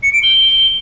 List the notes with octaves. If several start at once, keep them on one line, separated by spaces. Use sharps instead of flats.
C#7
D7
G7